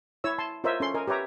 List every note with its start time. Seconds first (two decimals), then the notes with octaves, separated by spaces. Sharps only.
0.24 E4 C#5 E6
0.38 A5 C6
0.64 F4 A#4 C5 C#5 D#5 E5
0.80 C#4 A4 C6
0.94 A#4 D#5 G#5
1.08 G4 B4 C#5 E5 A#5